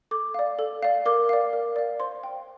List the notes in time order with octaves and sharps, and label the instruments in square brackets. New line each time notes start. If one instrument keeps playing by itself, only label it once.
[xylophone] A4 D6
D5 F5
A4
D5 F5
A#4 D6
D5 F5
A#4
D5 F5
C5 C6
G5